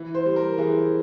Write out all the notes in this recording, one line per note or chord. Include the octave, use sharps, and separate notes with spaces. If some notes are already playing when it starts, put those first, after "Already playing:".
Already playing: E3
C5
G3
A#4
E3 G#4